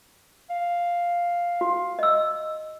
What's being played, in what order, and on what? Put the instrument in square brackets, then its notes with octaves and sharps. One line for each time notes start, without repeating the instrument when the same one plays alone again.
[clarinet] F5
[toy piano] F#4
D#5 E6